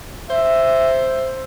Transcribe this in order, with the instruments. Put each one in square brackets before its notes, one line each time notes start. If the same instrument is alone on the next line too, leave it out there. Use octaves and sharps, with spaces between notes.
[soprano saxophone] C5 [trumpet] E5